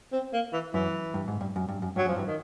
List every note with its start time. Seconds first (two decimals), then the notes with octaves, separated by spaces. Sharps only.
0.13 C4
0.34 A#3
0.53 E3
0.74 F#2 E3
1.14 G2
1.28 G#2
1.41 G2
1.56 F#2
1.69 G2
1.82 F#2
1.96 G2 F#3
2.06 F#2 F3
2.16 G2 E3
2.27 D#3